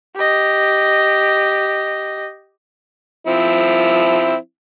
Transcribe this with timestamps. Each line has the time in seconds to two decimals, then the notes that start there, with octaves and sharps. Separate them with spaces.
0.16 G4 D#5
3.27 F3 C4 E4